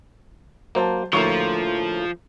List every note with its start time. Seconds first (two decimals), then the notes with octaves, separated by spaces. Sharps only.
0.75 F#3 A#3 C5 A5
1.13 D2 A2 F3 A#3 C#6